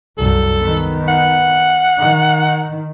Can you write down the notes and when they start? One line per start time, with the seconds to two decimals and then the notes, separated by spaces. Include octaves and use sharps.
0.18 C2 F#2 A4
0.61 D#3 B3
1.08 F#5
1.99 D#3